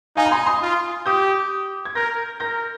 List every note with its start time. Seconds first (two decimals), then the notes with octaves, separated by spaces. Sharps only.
0.16 D#4 F5 G#5
0.26 A#5
0.31 G#5 C6
0.46 C6 D#6
0.62 F4
1.06 G4 D#6 G6
1.85 G#6
1.95 A#4 G6 A#6
2.40 A#4 G6 A#6